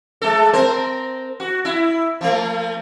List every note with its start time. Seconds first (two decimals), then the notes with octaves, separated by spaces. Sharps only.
0.22 G#3 A4
0.53 C4 A#4 C5
1.40 F#4
1.65 E4
2.21 F3 A3